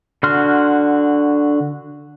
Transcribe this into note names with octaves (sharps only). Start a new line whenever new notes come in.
D3 F#4 C6 F6